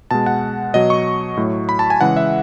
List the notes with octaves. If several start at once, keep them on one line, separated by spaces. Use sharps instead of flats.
B2 G#3 A5
F#5
B2 F#3 D#5
C#6
A2 F#3
B5
A5
G#5
C#3 E3 G#3 F#5
E5